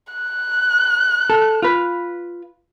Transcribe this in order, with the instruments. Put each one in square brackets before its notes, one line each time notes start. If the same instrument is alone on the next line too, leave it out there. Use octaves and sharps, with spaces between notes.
[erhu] F#6
[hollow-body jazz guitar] A4
F4 B4